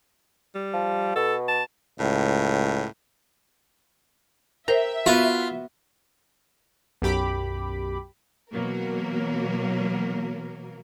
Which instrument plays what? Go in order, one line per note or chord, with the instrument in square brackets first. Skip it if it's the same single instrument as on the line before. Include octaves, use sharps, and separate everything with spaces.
[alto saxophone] G3
[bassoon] F3
[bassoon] B2 [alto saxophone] A4
[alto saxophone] A5
[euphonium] C#2 [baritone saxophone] A2
[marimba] A#4 C5 [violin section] E5 [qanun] G5 A#5
[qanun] B3 F#4 B4 [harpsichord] F4
[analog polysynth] B1 F#2 G4 B5 D6
[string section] B2 E3 F#3 A#3 A#4